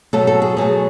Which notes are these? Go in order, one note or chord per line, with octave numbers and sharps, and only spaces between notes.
B2 F#3 A3 A4
A4
G#4
B2 F#3 A3 G#4